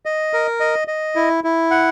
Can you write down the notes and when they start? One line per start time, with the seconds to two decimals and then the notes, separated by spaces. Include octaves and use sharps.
0.06 D#5
0.33 A#4
0.60 D#5
0.88 D#5
1.16 E4
1.44 E4
1.71 F#5